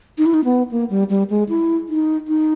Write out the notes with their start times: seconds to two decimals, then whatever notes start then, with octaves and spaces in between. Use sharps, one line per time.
0.18 D#4
0.26 E4
0.34 D#4
0.45 B3
0.71 A#3
0.90 G3
1.10 G3
1.30 G#3
1.49 E4
1.89 D#4
2.28 D#4